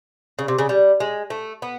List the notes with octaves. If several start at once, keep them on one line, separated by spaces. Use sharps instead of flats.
C#3
C3
C#3
G3
G#3
A3
B3